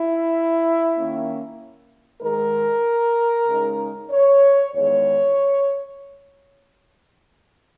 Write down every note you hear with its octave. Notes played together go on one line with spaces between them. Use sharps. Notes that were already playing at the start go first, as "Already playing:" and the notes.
Already playing: E4
D#3 A#3 C#4
G#2 D#3 G#3 A#4
C#3 G#3 D#4
C#5
E2 D#3 G#3 C#5